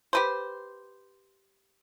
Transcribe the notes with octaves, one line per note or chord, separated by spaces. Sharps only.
G4 B4 C5